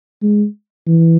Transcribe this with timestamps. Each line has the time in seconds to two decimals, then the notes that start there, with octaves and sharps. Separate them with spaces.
0.22 G#3
0.87 E3